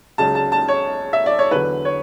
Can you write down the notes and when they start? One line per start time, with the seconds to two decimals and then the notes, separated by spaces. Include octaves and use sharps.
0.18 C#2 C#3 F#3 A5
0.35 A5
0.52 A5
0.68 C#5
1.13 E5
1.26 D5
1.39 C#5
1.51 E2 D3 F#3 B4
1.85 C#5